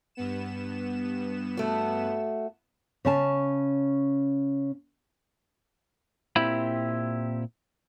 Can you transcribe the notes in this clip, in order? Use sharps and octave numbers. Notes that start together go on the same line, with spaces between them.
G2 B3 E7
A3 F#4
C#3 C#4 A5
A#2 C4 E4 G4 B5